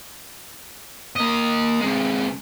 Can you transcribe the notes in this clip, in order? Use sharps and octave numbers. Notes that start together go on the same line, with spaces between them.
A#3 D#5
C3 G#3